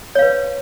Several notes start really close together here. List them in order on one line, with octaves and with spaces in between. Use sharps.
C#5 F5 B4